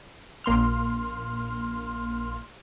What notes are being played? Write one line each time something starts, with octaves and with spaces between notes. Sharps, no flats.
A#1 A#3 C6 F6